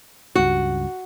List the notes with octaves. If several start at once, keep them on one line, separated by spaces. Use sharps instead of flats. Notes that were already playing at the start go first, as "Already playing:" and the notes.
C#2 G2 F#4